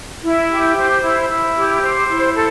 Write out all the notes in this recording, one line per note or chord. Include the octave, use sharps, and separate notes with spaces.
E4
G4
C5
E4
E4
G4
C5
E4
A4